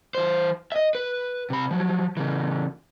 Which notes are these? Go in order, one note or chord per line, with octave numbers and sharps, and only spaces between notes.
E3 C5
D#5 E5
B4
C3 B5
F3 F#3
C#3 E3